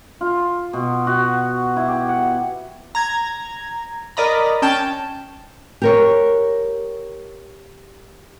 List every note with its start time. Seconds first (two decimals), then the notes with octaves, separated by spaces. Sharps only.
0.21 F4
0.73 B2
1.07 F#4
1.76 E4
1.88 G4
2.09 F#5
2.95 A#5 G#6
4.17 A#4 D5 D#5 A#5 B5
4.62 C#4 G5 A5 F6 E7
5.82 G4 A#4 C#5